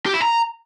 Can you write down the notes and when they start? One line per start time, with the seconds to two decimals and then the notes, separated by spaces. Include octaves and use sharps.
0.06 G4
0.14 E4
0.22 A#5